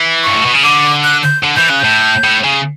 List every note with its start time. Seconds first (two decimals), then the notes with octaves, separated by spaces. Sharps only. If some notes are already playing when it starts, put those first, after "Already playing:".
Already playing: E3
0.23 G2 C#6
0.36 A2
0.46 B2
0.54 C#3
0.64 D3 D6
1.04 F#6
1.23 G6
1.44 D3
1.56 E3 G6
1.68 C#3 F#6
1.80 A2 G6
2.24 A2
2.44 C#3